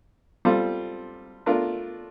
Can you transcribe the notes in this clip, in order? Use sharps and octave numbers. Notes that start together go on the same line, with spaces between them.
G3 C4 F4 A4
A3 D4 F4 A#4